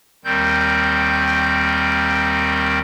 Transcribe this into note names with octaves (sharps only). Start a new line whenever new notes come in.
D#2 D#3 G3 C4 G6